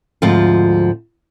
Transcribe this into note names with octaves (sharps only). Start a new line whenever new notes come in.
D2 G#2 F3 C4 F4